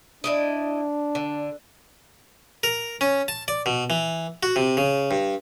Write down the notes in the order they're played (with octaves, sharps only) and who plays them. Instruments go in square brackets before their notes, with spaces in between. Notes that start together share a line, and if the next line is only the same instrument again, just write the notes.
[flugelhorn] D4 [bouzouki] E4 D5 D#5
[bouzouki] D3
[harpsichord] A#4
C#4
A5
D5
B2
E3
F#4
C3
C#3
G2